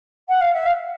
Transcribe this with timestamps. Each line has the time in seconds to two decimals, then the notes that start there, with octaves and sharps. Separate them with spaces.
0.28 F#5
0.41 F5
0.53 E5
0.65 F5